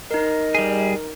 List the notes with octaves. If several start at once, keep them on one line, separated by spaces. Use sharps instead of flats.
D#4 A#4 D#5
G3 G#4